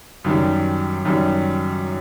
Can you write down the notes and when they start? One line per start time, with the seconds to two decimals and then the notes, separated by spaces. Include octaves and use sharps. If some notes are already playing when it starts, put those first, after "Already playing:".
0.24 F#2 D#3 G3
1.05 F#2 D#3 G3